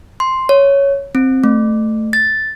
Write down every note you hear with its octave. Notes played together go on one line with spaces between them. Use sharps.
C6
C#5
C4
A3
A6